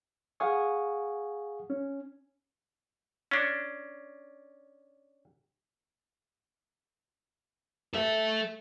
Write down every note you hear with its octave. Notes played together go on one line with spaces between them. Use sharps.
G#4 F5 F#5 G#5 C#6 D#6
C#4
C#4 D4
A4 E5